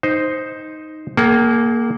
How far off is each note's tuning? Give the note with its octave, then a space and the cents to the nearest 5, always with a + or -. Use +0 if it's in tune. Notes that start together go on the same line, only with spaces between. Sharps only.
D#4 +0 C5 +0
A#3 +0 G#4 +35 G5 -45